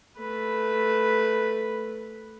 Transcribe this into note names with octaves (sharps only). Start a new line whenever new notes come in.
A3 B4